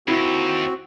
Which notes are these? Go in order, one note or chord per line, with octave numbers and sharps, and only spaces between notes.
D#2 C4 E4 F#4